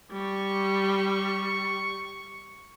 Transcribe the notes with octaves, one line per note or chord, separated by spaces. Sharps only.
G3 C#6